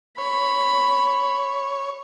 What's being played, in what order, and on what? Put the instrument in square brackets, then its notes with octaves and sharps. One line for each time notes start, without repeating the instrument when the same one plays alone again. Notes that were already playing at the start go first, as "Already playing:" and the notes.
[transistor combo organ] C#5 [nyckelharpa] B5